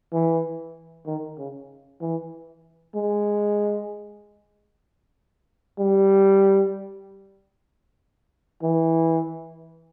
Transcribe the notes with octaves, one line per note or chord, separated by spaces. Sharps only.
E3
D#3
C#3
E3
G#3
G3
E3